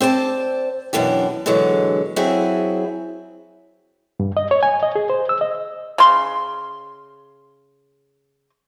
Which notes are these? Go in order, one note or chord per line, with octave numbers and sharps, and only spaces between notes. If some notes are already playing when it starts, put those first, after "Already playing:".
C4 C5 D5 A5
F#2 B2 E3 D4 G4
B2 D3 E3 F#3 G#3
F#3 C4 E4 G#4
G2
D#5
C#5
G#5
D#5
G#4
C5
E6
D#5
C#3 C6